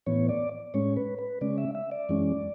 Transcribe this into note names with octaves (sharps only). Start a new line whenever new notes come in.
A2 E3 B3 C#5
D5
A2 G#3 C#4 C#5
B4
B4
C#3 G#3 C#4 D5
E5
E5
D5
F#2 E3 G#3 C#4